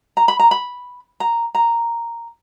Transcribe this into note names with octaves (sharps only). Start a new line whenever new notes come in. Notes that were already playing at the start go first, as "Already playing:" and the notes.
A#5
B5
A#5
B5
A#5
A#5